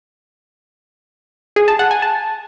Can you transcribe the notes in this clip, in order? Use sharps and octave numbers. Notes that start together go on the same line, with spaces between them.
G#4
A5
F#5
G#5
A5